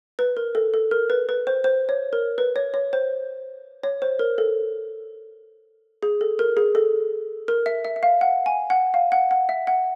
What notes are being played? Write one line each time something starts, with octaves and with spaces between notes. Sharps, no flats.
B4
A#4
A4
A4
A#4
B4
B4
C5
C5
C#5
A#4
B4
C#5
C#5
C5
C#5
C5
A#4
A4
G#4
A4
A#4
G#4
A4
A#4
E5
E5
E5
F5
F#5
G#5
F#5
F5
F#5
F#5
E5
F#5